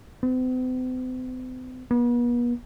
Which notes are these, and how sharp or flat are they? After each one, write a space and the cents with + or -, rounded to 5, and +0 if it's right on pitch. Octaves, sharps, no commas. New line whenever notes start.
C4 -45
B3 -40